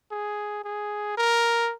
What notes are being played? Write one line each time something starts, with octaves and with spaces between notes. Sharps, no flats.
G#4
G#4
A#4